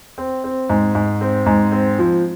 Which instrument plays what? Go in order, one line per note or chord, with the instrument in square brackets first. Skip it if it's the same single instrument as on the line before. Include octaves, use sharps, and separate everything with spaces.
[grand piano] C4
C4
G#2
G#2
C4
G#2
C4
F3